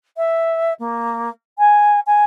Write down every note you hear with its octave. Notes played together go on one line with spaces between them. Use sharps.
E5
A#3
G#5
G#5